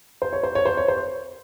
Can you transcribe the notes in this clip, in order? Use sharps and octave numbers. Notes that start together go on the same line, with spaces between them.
C5
C#5
C5
C#5
C5
C#5
C5